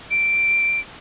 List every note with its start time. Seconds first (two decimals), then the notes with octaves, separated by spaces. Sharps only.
0.11 D7